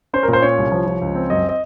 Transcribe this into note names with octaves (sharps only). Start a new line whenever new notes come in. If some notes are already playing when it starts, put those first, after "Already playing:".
C#4 C5
A#4
A#2
C5
C#4 C#5
C2
F3
F3
C#2
C4
F#2 D#5
D#5